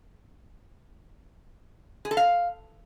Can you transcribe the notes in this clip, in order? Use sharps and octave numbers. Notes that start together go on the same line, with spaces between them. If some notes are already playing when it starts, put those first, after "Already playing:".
G#4
A4
F5